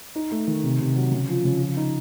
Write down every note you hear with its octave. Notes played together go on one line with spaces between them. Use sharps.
D#4
A3
D#3
C3
C3
F#3
C#3
F3
C#3
F3
D#4